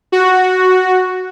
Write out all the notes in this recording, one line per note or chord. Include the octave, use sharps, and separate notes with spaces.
F#4